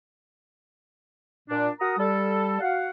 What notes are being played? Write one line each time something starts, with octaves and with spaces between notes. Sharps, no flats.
A#2 D4
F#4 A#4 A#5 D#6
G3 A4
F#4 F5 F#5